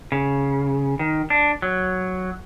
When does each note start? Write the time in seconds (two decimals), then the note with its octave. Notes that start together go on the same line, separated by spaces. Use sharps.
0.12 C#3
0.99 D#3
1.30 D4
1.62 F#3